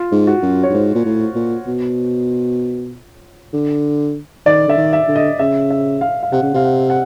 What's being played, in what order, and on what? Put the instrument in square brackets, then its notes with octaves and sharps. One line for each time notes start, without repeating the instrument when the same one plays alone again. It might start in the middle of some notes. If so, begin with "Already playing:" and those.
Already playing: [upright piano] F4
[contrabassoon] G#2
[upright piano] F#4
[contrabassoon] F#2
[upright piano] C#5
[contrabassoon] G2
[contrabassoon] G#2 [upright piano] C5
[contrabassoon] A#2
A2
A#2
B2
D3
[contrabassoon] D#3 [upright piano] D5
[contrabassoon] D3 [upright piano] E5
[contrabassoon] D#3
[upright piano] E5
[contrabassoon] D3
[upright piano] D#5
[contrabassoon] C#3 [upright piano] E5
[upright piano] E5
F5
F5
[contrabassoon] C3 [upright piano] F#5
[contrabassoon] C#3
[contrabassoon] C3 [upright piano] F5
[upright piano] F#5
F#5